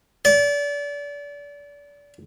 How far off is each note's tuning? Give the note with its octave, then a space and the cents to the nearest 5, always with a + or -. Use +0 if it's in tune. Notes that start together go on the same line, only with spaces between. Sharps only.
D5 -30